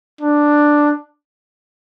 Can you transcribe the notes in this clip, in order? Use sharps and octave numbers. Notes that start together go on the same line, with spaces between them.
D4